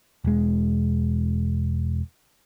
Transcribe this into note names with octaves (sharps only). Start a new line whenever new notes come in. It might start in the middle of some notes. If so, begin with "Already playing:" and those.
E1 G#3